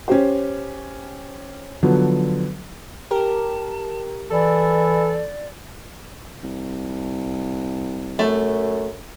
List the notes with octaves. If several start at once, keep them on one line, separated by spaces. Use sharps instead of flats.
C#4 G4 C5
D3 F3 F#3 B3
G4 A#4 A5
E3 A4 D5
C2
F#2 A3